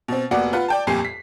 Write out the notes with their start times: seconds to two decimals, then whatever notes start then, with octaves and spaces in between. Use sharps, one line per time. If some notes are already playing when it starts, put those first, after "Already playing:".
0.08 B2 C4
0.31 F1 A#3 B3 F#4 D5 F#5
0.53 F4 B4 F#5
0.68 D5 G5 A5
0.87 G1 F2 A#2 G4 G#5 C7
1.05 B6